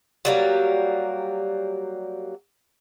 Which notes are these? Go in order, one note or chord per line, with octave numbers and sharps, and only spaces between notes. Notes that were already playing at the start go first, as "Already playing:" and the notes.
F#3 G3 A#3